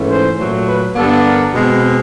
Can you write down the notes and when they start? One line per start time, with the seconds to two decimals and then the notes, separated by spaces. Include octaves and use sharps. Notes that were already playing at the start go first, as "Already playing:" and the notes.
Already playing: G#2 E3 A3 C#4
0.10 C5
0.38 A#2 F#3 A3
0.67 B4
0.96 G2 D3 G3 B3 D4 A4
1.24 A#4
1.53 B2 G#3 C4